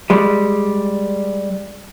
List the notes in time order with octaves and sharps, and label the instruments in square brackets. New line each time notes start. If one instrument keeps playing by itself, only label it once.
[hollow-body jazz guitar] G3 G#3